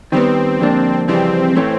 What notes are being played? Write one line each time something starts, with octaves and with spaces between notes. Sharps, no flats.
D#3 G3 B3 C4
F2 D3 G3 A#3 D4
F2 C#3 E3 G3 C4
A2 E3 A3 C#4